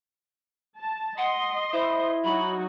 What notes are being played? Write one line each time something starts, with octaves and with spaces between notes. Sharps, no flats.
A5
D#5 F#5 C6
E4 C5
F#3 D#4 F#4 B5